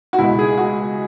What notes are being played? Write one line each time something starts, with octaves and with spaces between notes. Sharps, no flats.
F#4
C#2 B2 G#3 E4
G#4
F#4